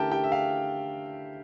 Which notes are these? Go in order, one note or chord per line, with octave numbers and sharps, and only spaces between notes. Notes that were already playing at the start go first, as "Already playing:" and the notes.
Already playing: D3 A3 C#4 E4 G4 A#4 G5 A5
G4 G5
E5
F5